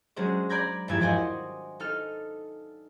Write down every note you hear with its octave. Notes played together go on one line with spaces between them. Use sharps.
F#3 G#3 C#4 D4 G#4 C5
D5 A#5 B5 G6 G#6 A#6
G#1 E2 G2 F3 E6 G#6
F#4 C5 D5 D#5 G5 G#5
D#4 A4 F6